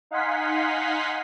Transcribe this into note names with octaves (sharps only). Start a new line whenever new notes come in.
D#4 F5 F#5 G#5 C6 B6